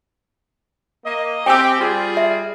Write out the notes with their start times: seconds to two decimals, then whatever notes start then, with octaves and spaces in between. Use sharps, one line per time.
1.05 A#3 D#5
1.46 C4 G4 G5 G#5 E6
1.80 G3 F4 G#4
2.17 E5